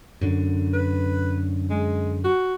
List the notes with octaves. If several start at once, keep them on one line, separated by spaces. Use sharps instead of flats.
F#2 D3
B4
G#3
F#4